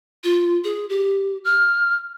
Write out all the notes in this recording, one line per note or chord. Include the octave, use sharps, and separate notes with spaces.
F4
G#4
G4
F6